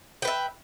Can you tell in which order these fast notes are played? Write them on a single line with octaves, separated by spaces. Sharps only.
G5 B4 E5